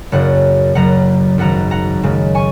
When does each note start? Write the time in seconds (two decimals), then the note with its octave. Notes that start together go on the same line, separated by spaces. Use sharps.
0.12 F#1 F#2 C#3 C#5 F#5
0.75 F#1 F#2 F#3 F#5 A#5
1.38 G#1 F#2 F#3 F#5 A#5
1.71 F#5 A#5
2.03 F#2 C#3 G#3
2.35 G#5 C#6